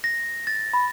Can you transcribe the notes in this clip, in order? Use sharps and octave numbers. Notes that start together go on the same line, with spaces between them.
A#6
A6
B5